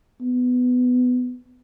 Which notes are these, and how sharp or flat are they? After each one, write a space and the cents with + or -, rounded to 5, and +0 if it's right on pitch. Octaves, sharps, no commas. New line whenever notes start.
B3 +15